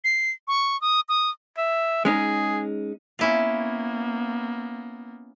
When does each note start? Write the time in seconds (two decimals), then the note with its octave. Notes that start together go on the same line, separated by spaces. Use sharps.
0.04 C7
0.47 C#6
0.81 D#6
1.09 D#6
1.58 E5
2.05 G#3 C#4 D#4 G#4
3.19 A#3 B3 C#4 E4 F4